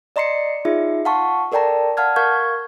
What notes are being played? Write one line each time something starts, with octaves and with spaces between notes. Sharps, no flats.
D5 D#5 A#5 C6 C7 C#7
D#4 F4 G#4 E5
F5 F#5 A5 C6 C#6
A4 A#4 D5 G5 A5 A#5
F5 F#5 A5 F6 G#6
A#4 F5 C#6 G6 G#6